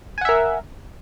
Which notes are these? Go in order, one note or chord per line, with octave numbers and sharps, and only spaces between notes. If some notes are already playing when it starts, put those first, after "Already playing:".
A#4 E5 F#5 G#5